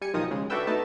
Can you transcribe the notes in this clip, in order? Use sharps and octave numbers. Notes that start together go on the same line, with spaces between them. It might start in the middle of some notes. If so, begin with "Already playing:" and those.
G3 G#5 C#7
B1 D#3 F3 D#4 D#6
C#3 G#3
D4 F#4 A4 B4 E5 G5
A3 B3 D#4 A5